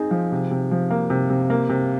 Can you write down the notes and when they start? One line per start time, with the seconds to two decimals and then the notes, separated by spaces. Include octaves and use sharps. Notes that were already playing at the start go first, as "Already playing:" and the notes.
Already playing: C4 D#4 G#4
0.11 F3
0.32 C3
0.51 C3
0.71 F3
0.90 A#3
1.10 C3
1.30 C3
1.50 A#3
1.69 C3